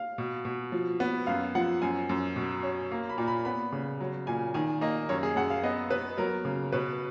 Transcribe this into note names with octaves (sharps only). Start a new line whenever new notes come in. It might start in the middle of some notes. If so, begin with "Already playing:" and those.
Already playing: F5
B2
B2
F3
B3
F#2 F5
F3 F#5
F#2 G#5
F#2
B2
C#4
A#3
B5
A#2
B5
B3 B5
C#3
F#3
A#2 G#5
D#3 G#5
A#3 D#5
F#2 C#5
G#4
F#2 F#5
F5
B3 D#5
B3 B4
F#3 A#4
C#3
B2 B4